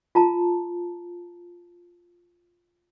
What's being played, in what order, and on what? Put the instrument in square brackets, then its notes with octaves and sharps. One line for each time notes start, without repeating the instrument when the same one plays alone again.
[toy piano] F4 A5 A#5